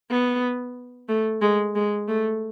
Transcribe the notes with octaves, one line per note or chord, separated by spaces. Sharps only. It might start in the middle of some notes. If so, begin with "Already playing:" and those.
B3
A3
G#3
G#3
A3